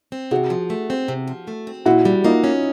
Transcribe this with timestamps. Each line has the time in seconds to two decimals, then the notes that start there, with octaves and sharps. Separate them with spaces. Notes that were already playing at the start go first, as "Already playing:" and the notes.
0.12 C4
0.31 C3 F#4 G#4
0.50 F3
0.70 A3
0.90 C4
1.08 C3
1.28 F3
1.48 A3
1.67 C4
1.86 A#2 E4 F#4
2.05 G3
2.24 A#3 D#4 F4
2.44 C#4